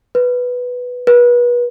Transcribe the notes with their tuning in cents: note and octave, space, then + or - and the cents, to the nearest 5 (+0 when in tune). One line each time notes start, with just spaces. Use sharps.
B4 +0
B4 -30